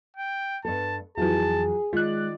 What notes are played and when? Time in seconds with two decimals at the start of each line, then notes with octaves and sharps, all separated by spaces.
0.17 G5
0.65 G2 B3 A4 A5
1.18 F2 E3 F#3 F4 F#4 G#4 A5
1.93 D#3 G#3 F4 D5 F#6